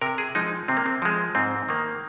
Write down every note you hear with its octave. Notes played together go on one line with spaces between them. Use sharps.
C3 A#4
G#4
F3 G#3 D#4
C3 C4
A#3
C4
F3 G#3
G#2 C4
D#3 A#3